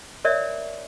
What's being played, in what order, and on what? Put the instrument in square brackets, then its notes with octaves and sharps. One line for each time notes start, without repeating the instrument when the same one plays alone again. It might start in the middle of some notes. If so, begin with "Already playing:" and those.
[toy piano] A#4 C#5 D5 E5